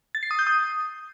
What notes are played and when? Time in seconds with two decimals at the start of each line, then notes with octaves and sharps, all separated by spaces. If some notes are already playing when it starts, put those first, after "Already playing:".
0.15 A6
0.23 C7
0.31 D#6
0.39 G6
0.47 D#6